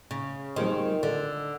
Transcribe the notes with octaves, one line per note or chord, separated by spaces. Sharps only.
C#3
D#3 G3 C4 F4 G#4 C5
D3